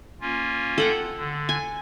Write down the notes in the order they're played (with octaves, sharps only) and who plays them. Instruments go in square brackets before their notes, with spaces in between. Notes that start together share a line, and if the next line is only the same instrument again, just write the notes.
[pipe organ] A#3 C#4 F4
[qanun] A4 F#5 G5
[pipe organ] D3
[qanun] G#5